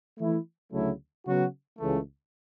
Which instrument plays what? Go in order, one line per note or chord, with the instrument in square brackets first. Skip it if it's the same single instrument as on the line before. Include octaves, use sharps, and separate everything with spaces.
[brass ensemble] E3 A3 E4
D2 C#3 F#3 A3 E4
C#3 F#3 B3 F#4
C#2 C#3 E3 A3